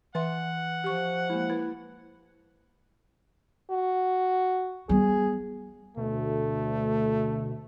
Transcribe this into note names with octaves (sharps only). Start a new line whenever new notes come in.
E3 B4 E5 F#5 C6
F3 G4 C#6
G#3 A#3 E4
E4 B4
F#4
G3 B3 G#4
D2 B2 A3